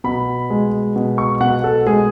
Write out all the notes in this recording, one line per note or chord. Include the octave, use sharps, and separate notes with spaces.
B2 B5
G#3
B2
C#6
B2 F#5
A4
G#3 G#4